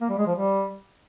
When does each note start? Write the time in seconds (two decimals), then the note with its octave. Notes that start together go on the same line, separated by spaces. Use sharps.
0.01 A#3
0.09 G3
0.18 G#3
0.27 F3
0.35 G3